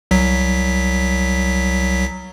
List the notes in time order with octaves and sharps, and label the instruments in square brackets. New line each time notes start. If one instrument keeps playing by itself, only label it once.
[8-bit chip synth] C2 F#3 B6